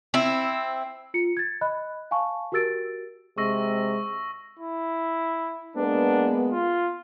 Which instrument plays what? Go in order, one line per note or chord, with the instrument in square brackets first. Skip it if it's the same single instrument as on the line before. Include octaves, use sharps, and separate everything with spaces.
[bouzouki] C4 E4
[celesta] F4 C#7
G#6 A6
D#5 B5 F#6
F5 G#5 A5 C#6
F#4 G4 A#4 E6 A6 D7
[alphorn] C3 [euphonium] G#3 [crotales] C#6 E6 A#6
[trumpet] E4
[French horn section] G#3 A#3 B3 [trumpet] D4
[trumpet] F4